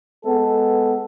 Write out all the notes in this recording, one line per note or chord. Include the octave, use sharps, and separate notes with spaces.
G#3 B3 A4